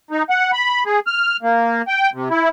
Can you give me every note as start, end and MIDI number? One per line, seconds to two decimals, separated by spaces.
0.11 0.23 63
0.30 0.51 78
0.53 0.83 83
0.86 0.99 68
1.07 1.37 89
1.43 1.82 58
1.88 2.10 79
2.14 2.29 48
2.30 2.49 64